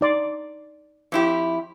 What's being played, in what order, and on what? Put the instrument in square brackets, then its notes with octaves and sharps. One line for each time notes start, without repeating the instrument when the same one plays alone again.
[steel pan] D#4 D5 C6
[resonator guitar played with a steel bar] F2 E4 G4